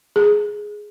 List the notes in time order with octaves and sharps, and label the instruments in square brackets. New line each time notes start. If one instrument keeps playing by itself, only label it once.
[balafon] G#4